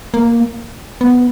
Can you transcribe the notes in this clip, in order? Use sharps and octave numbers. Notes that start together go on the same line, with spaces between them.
A#3
B3